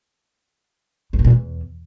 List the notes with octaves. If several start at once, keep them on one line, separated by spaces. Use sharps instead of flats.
F#2
B2
A#2
E2